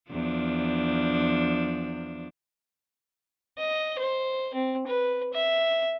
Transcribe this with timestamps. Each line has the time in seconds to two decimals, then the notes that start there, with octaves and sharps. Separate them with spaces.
0.10 E2 F3 D4
3.58 D#5
3.99 C5
4.54 C4
4.87 B4
5.33 E5